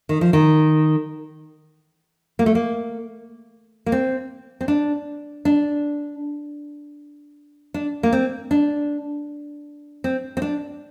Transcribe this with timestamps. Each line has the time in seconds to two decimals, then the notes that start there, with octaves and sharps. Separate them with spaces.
0.09 D#3
0.21 F3
0.33 D#3
2.39 A#3
2.46 A3
2.55 A#3
3.86 A#3
3.92 C4
4.61 C4
4.68 D4
5.45 D4
7.74 D4
8.03 A#3
8.13 C4
8.51 D4
10.04 C4
10.37 C4
10.42 D4